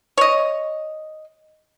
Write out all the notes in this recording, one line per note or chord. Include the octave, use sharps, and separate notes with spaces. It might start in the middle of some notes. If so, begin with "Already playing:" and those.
C#5 D#5